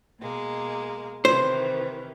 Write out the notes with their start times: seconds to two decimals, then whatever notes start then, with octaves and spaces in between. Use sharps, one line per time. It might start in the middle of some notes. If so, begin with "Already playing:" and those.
0.20 B2 G#3 A#3
1.25 C3 D#3 E3 C5